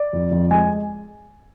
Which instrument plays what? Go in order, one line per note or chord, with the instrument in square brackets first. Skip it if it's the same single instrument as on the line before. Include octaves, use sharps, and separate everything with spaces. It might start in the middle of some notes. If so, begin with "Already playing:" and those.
Already playing: [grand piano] D5
F2
F2
G#3 G#5